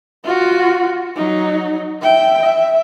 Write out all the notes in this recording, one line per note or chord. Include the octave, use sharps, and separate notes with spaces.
F4 F#4
F#3 D#4
E5 G5
E5